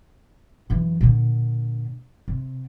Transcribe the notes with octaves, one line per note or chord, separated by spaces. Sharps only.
F#2 E3
A#2 D3
C3